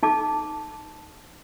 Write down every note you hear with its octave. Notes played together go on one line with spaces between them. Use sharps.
D#4 A5 D6